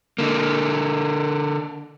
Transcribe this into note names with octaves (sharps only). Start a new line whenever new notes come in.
D3 A#3